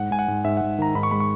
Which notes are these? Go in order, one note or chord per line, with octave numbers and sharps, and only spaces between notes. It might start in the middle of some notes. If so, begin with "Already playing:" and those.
Already playing: G#2 F#5
G#2 G#5
F#5
G#2
G#2 E5
F#5
G#2
D#3 A#5
G#2 B5
C#6
G#3 B5
C#6